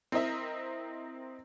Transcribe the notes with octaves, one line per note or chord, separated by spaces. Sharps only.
C4 E4 A#4 D#5 E5